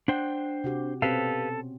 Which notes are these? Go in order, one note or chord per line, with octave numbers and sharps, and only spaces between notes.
D4 C5 F#5 G5
C3 F#4 G4
B2 C4 C#4 G4 A4 B4 F5